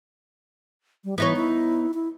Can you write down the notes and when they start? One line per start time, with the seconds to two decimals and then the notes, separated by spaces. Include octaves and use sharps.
1.04 G3
1.18 E3 B3 D#4 C#5
1.36 E4
1.94 E4